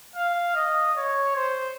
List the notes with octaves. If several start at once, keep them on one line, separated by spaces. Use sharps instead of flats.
F5
D#5
C#5
C5